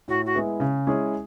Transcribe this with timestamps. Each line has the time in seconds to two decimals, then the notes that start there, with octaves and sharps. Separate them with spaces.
0.08 A2 F#4
0.25 F#4
0.35 G#3 B3 E4 G#4
0.60 C#3
0.87 G#3 C#4 E4 G#4